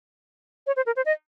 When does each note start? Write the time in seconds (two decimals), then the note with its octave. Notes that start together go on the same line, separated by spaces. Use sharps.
0.67 C#5
0.76 C5
0.86 A#4
0.96 C5
1.06 D#5